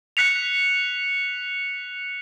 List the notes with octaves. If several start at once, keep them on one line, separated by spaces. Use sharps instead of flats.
F#6 B6 C#7 F7